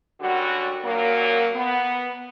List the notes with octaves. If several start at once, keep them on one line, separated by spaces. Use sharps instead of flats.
F#2 D3 G3 F#4
F#2 A#2 F#3 A#3
B3